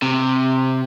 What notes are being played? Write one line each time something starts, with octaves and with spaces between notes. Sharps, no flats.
C3